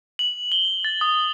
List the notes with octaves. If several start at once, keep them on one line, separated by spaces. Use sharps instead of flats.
F#7
G7
A6
D#6